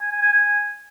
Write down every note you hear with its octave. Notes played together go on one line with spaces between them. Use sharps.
G#5
G#5
G#5
G#5